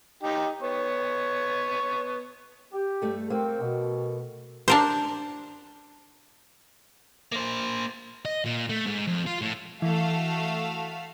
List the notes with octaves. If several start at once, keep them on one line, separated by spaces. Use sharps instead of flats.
D#4 G4
B3 C#5 C#6
G4
G2 A3 A4
A3 A#3 C4 A4
B2
D4 A#4 C5
A#3 C5
D#5
A#2
A3
G#2
F2
F4
A2
E3 A3 F#4 F5